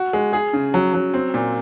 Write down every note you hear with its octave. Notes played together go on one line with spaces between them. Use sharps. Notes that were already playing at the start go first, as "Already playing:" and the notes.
Already playing: F#4
G#3
G#4
C#3
F#3
F#3
C4
A#2